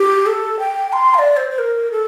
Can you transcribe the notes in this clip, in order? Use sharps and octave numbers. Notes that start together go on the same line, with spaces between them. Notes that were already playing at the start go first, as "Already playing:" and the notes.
Already playing: G4
A4
G5
C6
F5
D5
C5
C5
A#4
A4